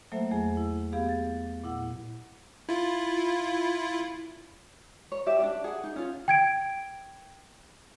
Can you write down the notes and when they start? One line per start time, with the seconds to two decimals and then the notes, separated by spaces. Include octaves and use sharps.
0.12 F#3 A3 A#3 A4 C5 E5
0.31 E2 F#3 A3 G#4
0.57 E4
0.92 B3 G4 G#4 F5
1.09 A6
1.64 A#2 E4 F#5
2.69 E4 F4
5.12 C#5
5.26 G4 D5 E5
5.39 D4 F4 G4 D5
5.64 G#4 F#5
5.84 D#4
5.96 C#4 F4
6.28 G5 G#6 D7